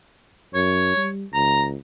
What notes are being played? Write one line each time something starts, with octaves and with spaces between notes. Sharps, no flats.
F#2 C#5
G3
C#2 A#5